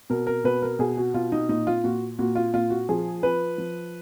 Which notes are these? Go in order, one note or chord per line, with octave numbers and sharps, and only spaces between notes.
B2 A#4
A#4
B2 B4
A#4
B2 G#4
F#4
B2 F4
D#4
A#2 D#4
F4
A#2 F#4
A#2 F#4
F4
A#2 F4
F#4
F3 G#4
F3 B4
F3